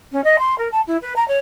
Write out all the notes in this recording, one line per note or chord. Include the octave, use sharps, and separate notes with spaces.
C#4
D#5
C6
A#4
A5
E4
B4
A#5
C#5